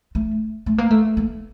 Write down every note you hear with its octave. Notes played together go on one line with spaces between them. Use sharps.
A3
A3
A#3
A3
A#3